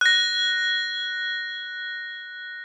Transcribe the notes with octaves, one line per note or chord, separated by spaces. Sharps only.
F#6 A#6